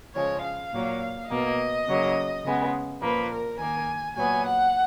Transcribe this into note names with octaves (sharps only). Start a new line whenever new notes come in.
C#3 F3 G#3 C#5
F5
A#2 F#3 A#3
B2 A#3 D#5
C#3 F#3 A#3
C#3 G#3 B3
A#2 F3 A#3 B4
A#4
D#3 A#3 G#5
A#2 F#3 B3 G#5
F#5